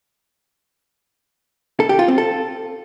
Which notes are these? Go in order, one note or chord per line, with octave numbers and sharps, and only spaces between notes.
A4
G4
F4
C4
A4